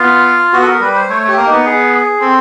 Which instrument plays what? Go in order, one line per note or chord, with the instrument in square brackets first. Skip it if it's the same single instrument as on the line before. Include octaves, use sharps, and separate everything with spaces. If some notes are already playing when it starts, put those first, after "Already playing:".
Already playing: [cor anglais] B3 [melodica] F4
[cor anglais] B3 [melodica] F#4
[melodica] A4
A#4
[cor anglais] G3 [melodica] B4
[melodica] C5
[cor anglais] A3 [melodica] C#5
[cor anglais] A3 [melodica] G4
[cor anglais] A#3
[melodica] D#4
[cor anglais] B3
[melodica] G#4
[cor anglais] C4 [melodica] A4